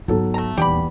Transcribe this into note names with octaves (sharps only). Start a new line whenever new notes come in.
G#2 F#3 B3 A4
A3 A#5
D#1 E2 G4 D5 B5